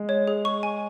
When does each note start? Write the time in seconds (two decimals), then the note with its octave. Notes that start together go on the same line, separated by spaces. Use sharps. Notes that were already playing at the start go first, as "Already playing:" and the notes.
Already playing: G#3
0.09 C#5
0.27 G#4
0.45 C#6
0.63 G#5